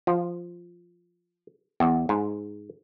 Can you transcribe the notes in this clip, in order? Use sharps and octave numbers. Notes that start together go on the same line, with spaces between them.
F3
E2
G#2